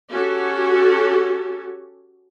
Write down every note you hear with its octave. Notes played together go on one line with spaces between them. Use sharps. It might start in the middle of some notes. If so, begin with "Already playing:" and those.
C#4 F#4 G4 A4